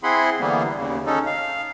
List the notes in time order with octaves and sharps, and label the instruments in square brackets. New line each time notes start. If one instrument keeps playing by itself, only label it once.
[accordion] C4 E4 G#4 F#5 B5 C6
D3 E3 G3 A#3 B3
D#2 C#3
C#4 D#4 A4
F5